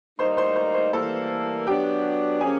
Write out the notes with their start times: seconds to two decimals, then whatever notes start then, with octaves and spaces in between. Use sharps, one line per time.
0.19 G3 A#3 D#4 C5 C6
0.37 C5 C6
0.55 C5 C6
0.74 C5 C6
0.93 E3 G3 A#3 A4 A5
1.67 F#3 B3 D4 F#4 G4 G5
2.41 F3 A#3 C#4 G#4 G#5